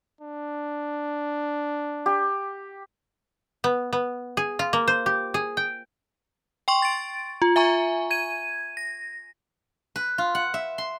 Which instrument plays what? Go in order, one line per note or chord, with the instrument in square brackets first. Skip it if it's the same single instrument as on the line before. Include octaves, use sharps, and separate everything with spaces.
[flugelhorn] D4
[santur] G4
[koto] B3
B3
G#4
F4
A#3
C5
G4
G#4
G5
[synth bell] G5 C6 C#6
A6 D7
F4
E5 G#5 A#5 C#6
G#6 D#7
A#6
[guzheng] B4
F4
F#5
E5
C6